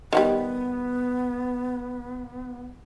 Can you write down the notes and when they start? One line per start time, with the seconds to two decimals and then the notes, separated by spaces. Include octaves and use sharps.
0.13 D#3 F#3 G3 B3